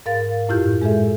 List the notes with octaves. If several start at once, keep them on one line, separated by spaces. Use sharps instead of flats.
G#2 A#4 F5 A6
F#2 A2 E4 F4 G4 G6
G#3 G#4 A4 E5